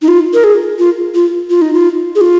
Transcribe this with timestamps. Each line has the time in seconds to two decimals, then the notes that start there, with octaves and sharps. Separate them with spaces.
0.02 D#4
0.08 F4
0.34 A#4
0.44 G#4
0.79 F4
1.15 F4
1.50 F4
1.62 D#4
1.73 F4
2.15 G#4
2.21 F4